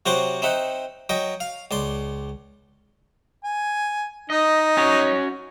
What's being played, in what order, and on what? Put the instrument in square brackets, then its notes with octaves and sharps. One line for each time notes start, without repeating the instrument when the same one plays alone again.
[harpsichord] C3 F#3 F#4 C5 C6 D6
C4 D#4 E5 F#5
F#3 D#5 G5
F5
C#2 D5 C6
[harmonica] G#5
[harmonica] D#4 [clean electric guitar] D#5
[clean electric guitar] C#4 F#4 C#5